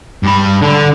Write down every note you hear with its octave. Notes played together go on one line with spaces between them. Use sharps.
G2 B5
D3